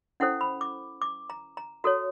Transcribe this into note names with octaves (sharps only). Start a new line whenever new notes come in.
C#4 E4 A4 C5 F#5
B5
D6
D6
A#5
A#5
F#4 A4 C#5 A#5